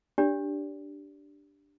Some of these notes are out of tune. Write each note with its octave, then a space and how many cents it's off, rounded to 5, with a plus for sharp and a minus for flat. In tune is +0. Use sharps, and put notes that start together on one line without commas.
D4 +0 G4 +0 D5 -30